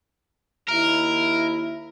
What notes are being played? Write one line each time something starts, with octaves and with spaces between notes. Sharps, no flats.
D#2 E4 A#4